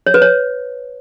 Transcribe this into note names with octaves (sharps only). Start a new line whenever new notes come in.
C#5
B4
C#5